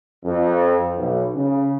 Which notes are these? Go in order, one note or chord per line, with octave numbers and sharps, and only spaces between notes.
F2
B1
C#3